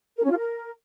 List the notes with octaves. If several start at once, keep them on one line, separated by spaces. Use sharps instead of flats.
A#4
C#4
F4
A#4